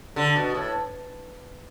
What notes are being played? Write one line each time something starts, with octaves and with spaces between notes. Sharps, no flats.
D3
B2
A2